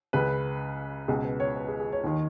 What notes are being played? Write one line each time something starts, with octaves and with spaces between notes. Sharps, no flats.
C#2 C#3 B4
C#2 B2 G#4
B4
C#5
B4
G#4
G#4
C#5
D#2 D#3